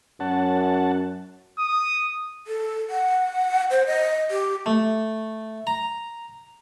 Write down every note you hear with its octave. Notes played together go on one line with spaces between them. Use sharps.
F#2 C#4 F#5 A5
D#6
A4
F#5
C5
D#5
G4
A3
A#5